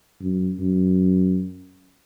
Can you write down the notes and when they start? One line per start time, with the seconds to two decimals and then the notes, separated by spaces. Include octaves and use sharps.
0.21 F#2
0.60 F#2